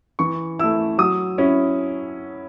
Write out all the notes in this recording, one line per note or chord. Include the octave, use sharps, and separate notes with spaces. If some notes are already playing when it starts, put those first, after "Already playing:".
E3 C#6
A3 E4 E6
F#3 D#6
C#4 E4